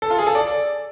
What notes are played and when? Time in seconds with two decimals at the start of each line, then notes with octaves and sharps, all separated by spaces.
0.02 A4
0.10 F4
0.19 G#4
0.27 A4
0.35 D5